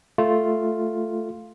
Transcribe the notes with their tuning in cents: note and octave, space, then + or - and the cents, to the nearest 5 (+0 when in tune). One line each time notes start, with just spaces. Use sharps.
A3 +0 F4 +0